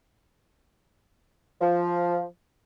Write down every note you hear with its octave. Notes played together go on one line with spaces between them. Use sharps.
F3